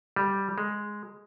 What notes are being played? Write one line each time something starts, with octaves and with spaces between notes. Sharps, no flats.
G3
G#3